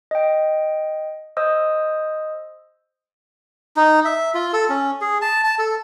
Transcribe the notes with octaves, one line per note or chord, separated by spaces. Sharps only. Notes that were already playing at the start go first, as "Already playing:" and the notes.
D#5 G5
C5 D#5 D#6 E6
D#4
E5
F4
A4
C#4
G#4
A5
A5
A4